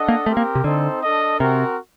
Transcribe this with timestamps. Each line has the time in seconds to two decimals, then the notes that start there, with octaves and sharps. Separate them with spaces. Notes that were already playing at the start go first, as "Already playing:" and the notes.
Already playing: D4 A4 D#5 F#5
0.08 A#3
0.26 A3 C4 G4 A#4
0.37 A#3
0.55 C3
0.64 D3 C4 D#4 A4 C5
1.02 D4 A4 D#5
1.39 C3 C4 F#4 A#4